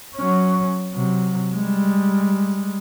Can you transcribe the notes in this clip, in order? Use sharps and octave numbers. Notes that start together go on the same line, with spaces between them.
F#3 C#4
C3 F#3
G3 G#3